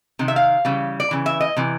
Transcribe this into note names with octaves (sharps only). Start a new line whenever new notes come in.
C3 D#3
E5
F5
C#3 E3 G3
D5
C#3 E3
E5
D#5
C3 E3